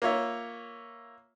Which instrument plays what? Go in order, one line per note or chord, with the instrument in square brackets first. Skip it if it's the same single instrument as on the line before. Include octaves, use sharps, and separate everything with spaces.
[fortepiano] A#3 F4 C#5 E5